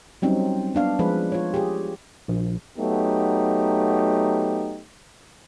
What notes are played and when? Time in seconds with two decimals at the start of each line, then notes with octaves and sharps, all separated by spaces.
0.22 F#3 G3 C4 C#4 D#4
0.75 B3 D4 F5
0.99 F3 G#3 G#4 B4
1.32 F4 C#5
1.54 G4 G#4
2.28 A#1
2.78 F#3 A3 B3 D#4 G4